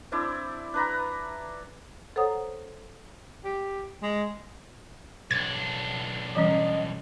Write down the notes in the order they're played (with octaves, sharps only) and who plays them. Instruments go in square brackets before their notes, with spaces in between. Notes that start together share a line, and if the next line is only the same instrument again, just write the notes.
[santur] C4 D4 E4 D5
D4 B4 A#5
[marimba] A4 C5 C#5 F#5 A#5 D#6
[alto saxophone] G4
G#3
[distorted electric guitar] B1 D4 [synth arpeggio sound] G#6 A6
[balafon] E3 G3 C#4 [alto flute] D#5